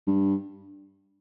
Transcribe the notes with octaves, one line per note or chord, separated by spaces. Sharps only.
G2